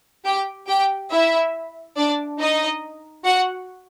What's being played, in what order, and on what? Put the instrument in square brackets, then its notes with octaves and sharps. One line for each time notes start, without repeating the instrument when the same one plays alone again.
[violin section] G4 G5
G4 G5
E4 E5
D4 D5
D#4 D#5
F#4 F#5